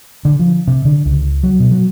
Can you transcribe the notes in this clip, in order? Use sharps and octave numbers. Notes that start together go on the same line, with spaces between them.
D3
F3
C3
D3
C#2
F#3
B2
F#3